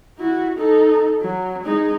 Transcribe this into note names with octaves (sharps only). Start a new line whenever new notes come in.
E4 F#4
D#4 A4
F#3
G#3 D#4